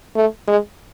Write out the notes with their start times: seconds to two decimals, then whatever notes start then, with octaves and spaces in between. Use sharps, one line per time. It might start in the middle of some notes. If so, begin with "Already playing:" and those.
0.16 A3
0.48 G#3